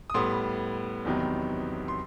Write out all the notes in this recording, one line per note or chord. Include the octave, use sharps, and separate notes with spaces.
D#6
A2 G3 B3 C6
E2 C3 D#3 F#3 B3
C6